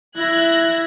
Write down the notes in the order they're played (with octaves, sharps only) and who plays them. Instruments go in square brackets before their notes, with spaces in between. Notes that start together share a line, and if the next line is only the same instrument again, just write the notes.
[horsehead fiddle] E4 E5 [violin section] F#6 G#6 A#6